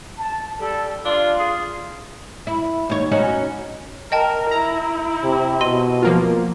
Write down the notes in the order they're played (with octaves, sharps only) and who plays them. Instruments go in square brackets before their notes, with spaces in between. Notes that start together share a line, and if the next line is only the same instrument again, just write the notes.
[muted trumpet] A5
[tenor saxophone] G3 [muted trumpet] A4
[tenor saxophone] D4 [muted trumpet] F4
[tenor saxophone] G#4
[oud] E4
D#2 C#5
C#4 D#4 F#4
[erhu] A#4 [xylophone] D#5 G5 A5
[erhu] E4 [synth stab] A#5
[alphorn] C3
[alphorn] B2 [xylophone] D#5 C6 D#7
[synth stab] F3 A#3 F4